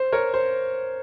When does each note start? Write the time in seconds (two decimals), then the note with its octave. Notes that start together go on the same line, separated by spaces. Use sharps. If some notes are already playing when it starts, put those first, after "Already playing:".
Already playing: C5
0.12 A#4 C#5
0.34 C5